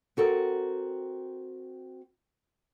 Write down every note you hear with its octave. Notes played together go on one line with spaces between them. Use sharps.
C4 F#4 A4 A#4